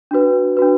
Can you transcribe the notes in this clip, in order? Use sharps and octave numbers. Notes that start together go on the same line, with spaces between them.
D4 F#4 B4
D4 F#4 B4